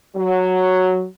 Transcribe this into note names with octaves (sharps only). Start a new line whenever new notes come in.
F#3